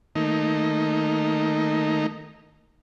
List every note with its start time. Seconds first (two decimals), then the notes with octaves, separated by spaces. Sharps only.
0.16 D#3 A3 A#3 D#4